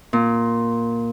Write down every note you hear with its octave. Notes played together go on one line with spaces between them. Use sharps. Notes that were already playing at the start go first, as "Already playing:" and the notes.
A#2